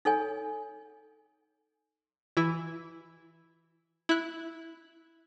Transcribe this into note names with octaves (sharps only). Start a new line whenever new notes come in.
D#4 A4 C#5 G#5
E3 E4
E4 F#6